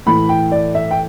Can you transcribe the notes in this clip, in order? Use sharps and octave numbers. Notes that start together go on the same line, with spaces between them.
A2 E3 B5
G5
D5
E5
G5